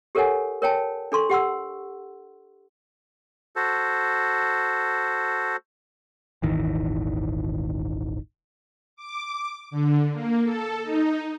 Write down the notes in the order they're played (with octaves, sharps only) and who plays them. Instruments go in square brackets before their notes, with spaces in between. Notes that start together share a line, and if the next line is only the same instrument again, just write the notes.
[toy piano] G4 A4 A#4 C#5 F#5 G#5
A#4 C#5 G5 A5
D4 A4 C6 C#6
G4 F#5 C6 E6
[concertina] F#4 A4 C5
[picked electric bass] D#1 G#1 D#3 E3
[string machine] D6
D3
A#3
A4
D#4